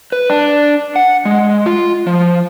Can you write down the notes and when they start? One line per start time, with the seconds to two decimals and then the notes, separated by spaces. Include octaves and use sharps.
0.12 B4
0.30 D4
0.96 F#5
1.25 G#3
1.66 F4
2.07 F3